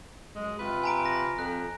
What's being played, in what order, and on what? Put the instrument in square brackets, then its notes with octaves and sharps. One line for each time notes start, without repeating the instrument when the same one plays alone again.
[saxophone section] F#2 G#3
C3 F4 B4
[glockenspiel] G#5 A#5 D7
A#6
[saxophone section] F2 [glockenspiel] F#6